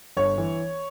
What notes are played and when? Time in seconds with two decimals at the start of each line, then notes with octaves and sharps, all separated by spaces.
0.17 G1 C#5
0.38 E3